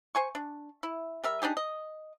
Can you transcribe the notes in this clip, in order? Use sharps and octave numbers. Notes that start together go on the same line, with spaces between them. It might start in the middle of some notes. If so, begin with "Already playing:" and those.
C5 G#5 C#6
D4
E4
G3 A#4 E5
D4 D#4 G4 G#4
D#5